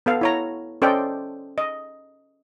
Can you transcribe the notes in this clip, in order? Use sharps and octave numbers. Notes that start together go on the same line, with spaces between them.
B3 A4 F5
E4 C#5 A#5
C#4 A4 C5 D5 D#5 G5
D#5